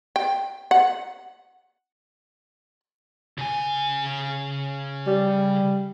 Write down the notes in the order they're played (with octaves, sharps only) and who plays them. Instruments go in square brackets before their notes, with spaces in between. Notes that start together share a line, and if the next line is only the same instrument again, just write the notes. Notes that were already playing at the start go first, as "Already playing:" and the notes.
[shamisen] G5
F#5
[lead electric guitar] C#3 G#5
[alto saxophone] G3